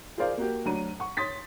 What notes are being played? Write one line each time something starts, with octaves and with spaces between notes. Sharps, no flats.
F4 G#4 A#4 C5 D5 F5
A#3 F#4 G4
D2 F#3 D4 A#5 D#7
F#5 C#6
C#5 C6 D#6 A6 B6